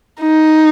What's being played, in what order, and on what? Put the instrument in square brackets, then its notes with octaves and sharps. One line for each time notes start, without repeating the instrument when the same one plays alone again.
[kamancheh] D#4